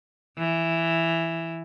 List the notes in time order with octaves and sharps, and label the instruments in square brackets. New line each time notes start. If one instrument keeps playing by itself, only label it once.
[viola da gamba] E3